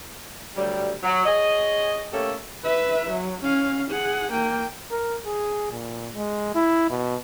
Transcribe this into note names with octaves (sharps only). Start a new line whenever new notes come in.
D2 F#3 G3
F#3
G#4 C#5 D#5
A3 A#3 C#4 G4 A4
B4 E5
F#3
C#4 F5
G#4 F#5
A#3 G5
A#4
G#4
A#2
G#3
E4
B2